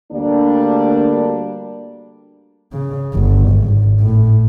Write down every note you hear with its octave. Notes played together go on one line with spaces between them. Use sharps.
D2 G3 A#3 D4
C#3
G1
G#1
A2